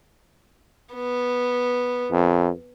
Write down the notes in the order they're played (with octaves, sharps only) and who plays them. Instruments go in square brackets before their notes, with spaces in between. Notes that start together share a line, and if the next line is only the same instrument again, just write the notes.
[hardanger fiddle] B3
[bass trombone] F2